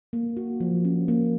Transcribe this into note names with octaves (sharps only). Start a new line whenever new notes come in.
A#3
F#4
F3
C#4
A#3